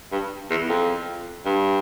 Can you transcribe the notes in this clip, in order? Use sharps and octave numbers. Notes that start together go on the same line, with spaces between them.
G2
E2
F2
G2